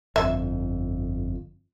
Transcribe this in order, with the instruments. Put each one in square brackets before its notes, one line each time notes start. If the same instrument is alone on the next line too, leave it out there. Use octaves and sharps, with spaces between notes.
[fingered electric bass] G1 F2 [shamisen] E5